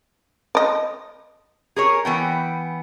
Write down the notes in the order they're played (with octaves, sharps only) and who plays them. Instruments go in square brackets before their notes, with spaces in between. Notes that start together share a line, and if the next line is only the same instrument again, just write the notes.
[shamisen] D5 D#5
[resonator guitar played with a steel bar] G#4 A#4 C#5
E3 B3 G5